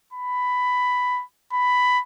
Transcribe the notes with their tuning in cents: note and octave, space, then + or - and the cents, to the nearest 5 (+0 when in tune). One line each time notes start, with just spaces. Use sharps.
B5 +10
B5 +10